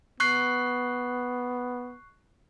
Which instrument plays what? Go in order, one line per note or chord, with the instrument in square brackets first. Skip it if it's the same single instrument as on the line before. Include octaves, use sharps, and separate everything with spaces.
[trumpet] B3 [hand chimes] C#6 F#6 C7